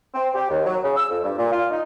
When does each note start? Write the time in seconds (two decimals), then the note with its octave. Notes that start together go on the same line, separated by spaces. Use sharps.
0.14 C4
0.34 G4
0.49 D#2
0.66 F#3
0.83 C#3
0.96 E6
1.09 F2
1.22 G2
1.37 A#2
1.51 F4
1.70 D#4